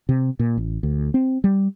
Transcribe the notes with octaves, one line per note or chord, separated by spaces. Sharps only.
C3
A#2
A1
D2
C4
G3